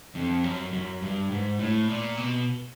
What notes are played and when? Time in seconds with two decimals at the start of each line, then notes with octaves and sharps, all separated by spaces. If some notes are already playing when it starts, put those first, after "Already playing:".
0.15 F2
0.44 F#2
0.73 F#2
1.02 G2
1.31 G#2
1.59 A2
1.88 A#2
2.17 B2